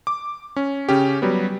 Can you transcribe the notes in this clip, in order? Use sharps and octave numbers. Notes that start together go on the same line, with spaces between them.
D6
C#4
C#3 C#4 G4
F#3 G3 B3